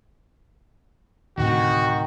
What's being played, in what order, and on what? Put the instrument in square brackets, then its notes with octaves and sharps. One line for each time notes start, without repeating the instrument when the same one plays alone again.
[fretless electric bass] D2 A2 C3 [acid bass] D#3 [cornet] F#4 [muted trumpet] G5